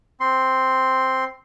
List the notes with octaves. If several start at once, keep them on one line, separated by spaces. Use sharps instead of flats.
C4 C6